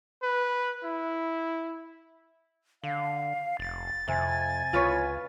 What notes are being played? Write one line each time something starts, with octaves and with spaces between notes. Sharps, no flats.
B4
E4
D3 F5
F1 A6
F2 C3 G#5
C#2 F4 B4 C#5